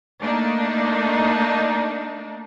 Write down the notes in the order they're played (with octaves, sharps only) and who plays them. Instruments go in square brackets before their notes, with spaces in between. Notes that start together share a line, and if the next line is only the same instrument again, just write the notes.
[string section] A3 A#3 D4 D#4